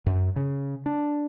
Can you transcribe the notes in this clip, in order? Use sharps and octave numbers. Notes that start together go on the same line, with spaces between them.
F#2
C#3
D4